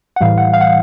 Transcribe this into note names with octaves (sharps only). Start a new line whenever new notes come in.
F#5
A2 E3 G3 F5
F#5
F5
F#5